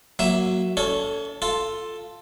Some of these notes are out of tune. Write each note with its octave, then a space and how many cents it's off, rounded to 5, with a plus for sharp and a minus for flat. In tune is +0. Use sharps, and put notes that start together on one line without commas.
F#3 +0 A#3 +0 E5 +10
C#4 +40 A4 +5 C#5 -15
F4 +0 A4 +0